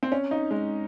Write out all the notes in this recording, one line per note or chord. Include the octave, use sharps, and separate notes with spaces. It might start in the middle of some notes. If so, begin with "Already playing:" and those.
C4
C#4
D#4
G#3